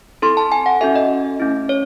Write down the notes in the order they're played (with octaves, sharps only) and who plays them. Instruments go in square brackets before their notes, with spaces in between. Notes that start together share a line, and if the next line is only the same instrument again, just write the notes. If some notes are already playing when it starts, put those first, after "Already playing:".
[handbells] C4 E4 A4 C6
A5
G#5
F#5
C#4 F#4 A4 E5
D#5
A3 C#4 E4
C#5